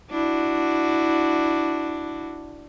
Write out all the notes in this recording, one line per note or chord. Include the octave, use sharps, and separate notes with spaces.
D4 E4 F#4